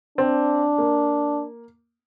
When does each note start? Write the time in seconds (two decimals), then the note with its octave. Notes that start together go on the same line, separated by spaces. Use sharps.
0.18 C4 D4
0.78 A#3